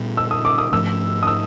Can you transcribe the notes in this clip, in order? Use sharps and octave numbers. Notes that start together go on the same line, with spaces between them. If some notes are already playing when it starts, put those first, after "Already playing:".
Already playing: A#2 G3 B3
E6
D#6
D6
D#6
G#2 F3 A3 C#4 E6
D#6
E6